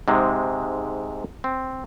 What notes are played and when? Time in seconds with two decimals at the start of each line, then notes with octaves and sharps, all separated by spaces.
0.08 G#2 C3 G#3
1.44 C4